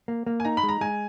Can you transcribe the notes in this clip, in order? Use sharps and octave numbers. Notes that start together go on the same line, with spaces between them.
A#3
A#3
G#5
D#4 A#5
B5
G#3
A#5
G#3 G#5